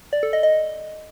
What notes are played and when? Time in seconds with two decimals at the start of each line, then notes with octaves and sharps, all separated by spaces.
0.13 D5
0.23 A4
0.33 D#5
0.43 D#5